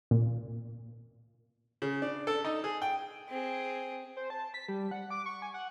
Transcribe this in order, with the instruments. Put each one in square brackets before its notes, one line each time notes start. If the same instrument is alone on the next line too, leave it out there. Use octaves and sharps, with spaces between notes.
[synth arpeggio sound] A#2
[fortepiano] C#3
D4
A4
D#4
G#4
G5
[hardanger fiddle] C4 G#4
[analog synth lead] C5
A5
B6
G3
F#5
D6
C#6
G#5
F#5